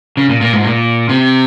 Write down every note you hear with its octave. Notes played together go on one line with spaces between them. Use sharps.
C#3
A#2
A#2
G#2
A#2
C3